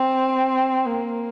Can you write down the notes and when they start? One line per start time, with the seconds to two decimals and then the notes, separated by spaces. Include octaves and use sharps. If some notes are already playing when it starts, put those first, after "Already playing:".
Already playing: C4
0.86 A#3